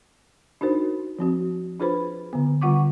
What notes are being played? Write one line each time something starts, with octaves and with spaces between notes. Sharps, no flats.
D4 D#4 F#4 A#4 C5
F3 C4 F#4
D4 F4 G#4 B4 C5 B5
D3 B3
D3 G3 F4 F#5 C#6 D6